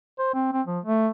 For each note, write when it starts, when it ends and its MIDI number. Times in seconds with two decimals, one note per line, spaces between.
0.19 0.30 72
0.34 0.50 60
0.53 0.62 60
0.67 0.79 53
0.85 1.09 57